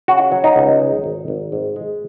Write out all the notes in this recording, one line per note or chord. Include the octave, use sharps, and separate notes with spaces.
C#3 F#4
F#3
D#4
C#2
G#3
G#1
G#1
G#2
G#3